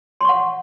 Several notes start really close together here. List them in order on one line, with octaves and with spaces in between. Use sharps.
C6 C#6 F#5